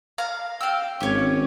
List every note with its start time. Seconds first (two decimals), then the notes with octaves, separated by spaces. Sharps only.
0.18 F5 A#5
0.61 F5 G5 E6
1.01 G#1 C#4 G4 C#5